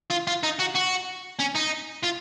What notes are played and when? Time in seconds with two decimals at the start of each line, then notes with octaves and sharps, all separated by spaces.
0.11 F4
0.27 F4
0.43 D#4
0.59 F#4
0.75 F#4
1.39 C#4
1.55 D#4
2.03 F4